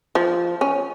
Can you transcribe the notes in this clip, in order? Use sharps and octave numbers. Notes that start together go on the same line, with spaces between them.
F3
C#4